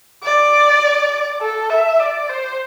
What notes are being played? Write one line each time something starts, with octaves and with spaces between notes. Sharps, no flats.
D5
A4
E5
D5
C5